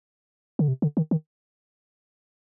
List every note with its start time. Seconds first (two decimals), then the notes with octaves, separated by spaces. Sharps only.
0.59 D3
0.68 C3
0.82 D3
0.97 D#3
1.11 D#3